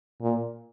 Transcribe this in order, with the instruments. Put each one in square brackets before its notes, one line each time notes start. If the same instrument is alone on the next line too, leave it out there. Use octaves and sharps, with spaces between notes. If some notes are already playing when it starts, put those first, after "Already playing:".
[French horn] A#2